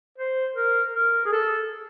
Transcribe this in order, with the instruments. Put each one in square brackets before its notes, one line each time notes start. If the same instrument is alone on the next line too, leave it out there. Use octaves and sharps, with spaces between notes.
[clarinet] C5
A#4
A#4
G#4
A4